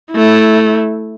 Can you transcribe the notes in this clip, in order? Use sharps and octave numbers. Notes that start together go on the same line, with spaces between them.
A3 E4